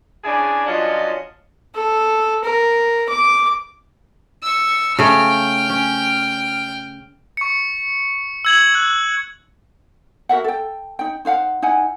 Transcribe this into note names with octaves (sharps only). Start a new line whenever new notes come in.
C#3 D4 E4 G#4 D5 G#5
F3 F#3 C#4 D4 F4 D#5
A4
A#4
D6
C#6 E6
C#3 A3 G5 F6
C#4
C#6 C#7
E6 G#6 F#7
F#6 G#6
F#4 A#4 E5 F#5
A4 G5
D#4 G5
D#4 C5 F5 F#5
D#4 E4 F#5 G#5